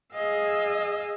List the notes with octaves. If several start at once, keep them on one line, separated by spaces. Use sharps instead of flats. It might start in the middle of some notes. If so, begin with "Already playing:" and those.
G#4 D#5 F5 E6